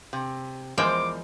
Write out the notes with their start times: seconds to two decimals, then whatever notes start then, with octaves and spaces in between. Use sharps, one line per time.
0.13 C3
0.78 E2 F3 G#3 A#4 C5 G5 D6